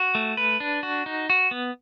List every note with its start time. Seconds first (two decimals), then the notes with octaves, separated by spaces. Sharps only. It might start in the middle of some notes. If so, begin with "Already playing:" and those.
Already playing: F#4
0.15 A3
0.37 B4
0.60 D4
0.83 F#4
1.06 D#4
1.30 F#4
1.51 B3